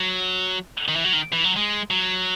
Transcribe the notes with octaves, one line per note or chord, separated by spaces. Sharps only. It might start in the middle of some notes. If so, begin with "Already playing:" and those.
Already playing: F#3
D#3
E3
F#3
D#3
E3
F#3
G#3
F#3